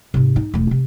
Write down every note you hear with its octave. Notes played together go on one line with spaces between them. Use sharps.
G#2 C3
D#4
E1 A3
C3